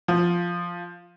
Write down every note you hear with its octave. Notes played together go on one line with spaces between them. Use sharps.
F3